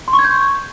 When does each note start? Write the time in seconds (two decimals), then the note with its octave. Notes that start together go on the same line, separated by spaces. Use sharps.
0.08 C6
0.13 C#6
0.19 G#6
0.24 G6